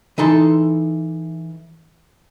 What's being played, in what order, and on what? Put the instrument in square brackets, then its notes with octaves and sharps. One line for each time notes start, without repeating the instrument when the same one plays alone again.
[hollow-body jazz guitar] E3 D#4 A4 C6